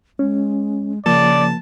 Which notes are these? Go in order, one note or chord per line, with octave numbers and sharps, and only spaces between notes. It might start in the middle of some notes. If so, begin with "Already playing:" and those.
G#3 C#4
C#3 F3 A#3 D5 A5